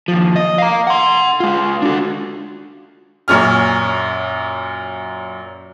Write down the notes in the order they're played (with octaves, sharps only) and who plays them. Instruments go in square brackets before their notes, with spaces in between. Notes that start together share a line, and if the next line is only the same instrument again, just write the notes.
[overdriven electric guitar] D#2 F3
D#5
F5 A#5
F#5 C6
G#3 F4
D4 F#4
[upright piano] F#2 A#2 C#4 F6